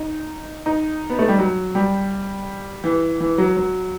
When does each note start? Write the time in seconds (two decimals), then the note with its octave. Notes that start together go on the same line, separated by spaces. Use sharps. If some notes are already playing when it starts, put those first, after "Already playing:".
Already playing: D#4
0.66 D#4
1.10 B3
1.19 A3
1.28 G3
1.39 F#3
1.75 G3
2.84 E3
3.20 E3
3.38 F#3
3.57 F#3